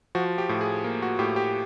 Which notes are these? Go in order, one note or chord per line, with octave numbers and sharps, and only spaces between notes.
F3 F#4
G4
A2
G#4
A#3
F#4
A2 G4
G4